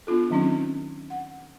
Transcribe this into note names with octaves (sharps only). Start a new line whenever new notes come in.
B3 D4 F4 A4
D#3 F#3 C4 C#4 D#4
F#5